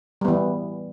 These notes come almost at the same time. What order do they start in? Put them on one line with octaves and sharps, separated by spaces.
G3 B3 E3